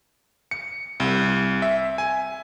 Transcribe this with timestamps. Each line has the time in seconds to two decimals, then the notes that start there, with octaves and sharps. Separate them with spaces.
0.51 C#7
1.00 C2
1.62 E5
1.98 G#5